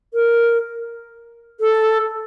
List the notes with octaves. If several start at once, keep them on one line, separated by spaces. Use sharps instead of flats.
A#4
A4